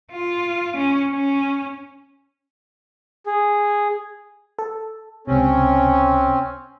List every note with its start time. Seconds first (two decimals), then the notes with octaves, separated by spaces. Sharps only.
0.12 F4
0.77 C#4
1.13 C#4
3.26 G#4
4.58 A4
5.27 C#2 C3 C4 C#4